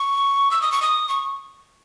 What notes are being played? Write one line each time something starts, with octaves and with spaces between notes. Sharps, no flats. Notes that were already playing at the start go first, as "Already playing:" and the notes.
Already playing: C#6
E6
D#6
C#6
D#6
C#6